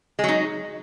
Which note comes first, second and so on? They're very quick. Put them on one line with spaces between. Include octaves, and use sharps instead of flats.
G#3 F#3 D#4